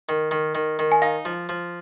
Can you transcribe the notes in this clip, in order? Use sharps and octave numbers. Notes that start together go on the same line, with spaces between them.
D#3
D#3
D#3
D#3
G#5
D#4 F5
F3
F3